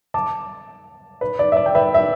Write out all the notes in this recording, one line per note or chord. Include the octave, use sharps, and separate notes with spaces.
A5 D6
B4
D5
E5
D5
G5
B4 E5
E5